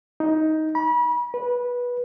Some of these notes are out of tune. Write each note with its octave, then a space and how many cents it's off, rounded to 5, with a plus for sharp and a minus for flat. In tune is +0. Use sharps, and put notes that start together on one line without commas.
D#4 +10
B5 -35
B4 -15